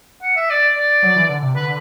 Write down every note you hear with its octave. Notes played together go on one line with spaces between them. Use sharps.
F#5
E5
D5
D5
F#3
E3
D3
C3
D3 B4